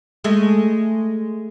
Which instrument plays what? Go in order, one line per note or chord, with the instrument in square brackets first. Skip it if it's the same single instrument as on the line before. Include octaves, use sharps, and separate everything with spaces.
[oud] G#3 A3